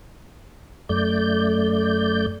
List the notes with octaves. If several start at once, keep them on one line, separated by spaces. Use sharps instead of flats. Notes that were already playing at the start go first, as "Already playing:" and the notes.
F#2 A3 D5 G6